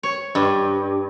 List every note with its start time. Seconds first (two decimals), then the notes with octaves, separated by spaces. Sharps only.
0.03 C#5
0.35 G2